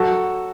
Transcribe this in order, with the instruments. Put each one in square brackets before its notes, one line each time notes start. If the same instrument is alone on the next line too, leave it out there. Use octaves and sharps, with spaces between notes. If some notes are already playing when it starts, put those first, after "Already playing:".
Already playing: [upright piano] F#3 F#4 A4